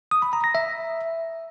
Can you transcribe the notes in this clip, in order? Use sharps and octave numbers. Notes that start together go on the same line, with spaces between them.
D#6
B5
A#5
A#6
E5